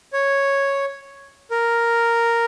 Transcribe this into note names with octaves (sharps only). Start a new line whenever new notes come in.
C#5
A#4